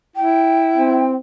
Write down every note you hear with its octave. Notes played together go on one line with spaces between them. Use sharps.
E4 G5
C4